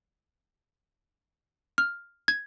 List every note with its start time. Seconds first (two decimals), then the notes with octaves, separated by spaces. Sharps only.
1.78 F6
2.28 G#6